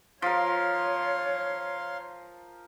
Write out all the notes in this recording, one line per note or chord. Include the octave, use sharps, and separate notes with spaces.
F3 A#4 C#5 F5 C6